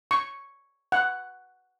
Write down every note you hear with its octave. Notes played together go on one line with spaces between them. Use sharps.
C#6
F#5